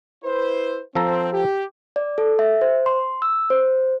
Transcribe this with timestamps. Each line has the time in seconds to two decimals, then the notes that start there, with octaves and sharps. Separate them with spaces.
0.24 E4 B4 C5
0.95 F3 C4 A4 A#5
1.33 G4
1.96 D5
2.18 A4
2.39 E5
2.61 C5
2.86 C6
3.22 E6
3.50 C5